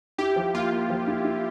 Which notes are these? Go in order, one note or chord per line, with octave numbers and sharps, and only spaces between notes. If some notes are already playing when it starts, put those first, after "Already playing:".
E4 G4
F3
A#3 F4
A#3
F3
E4
E4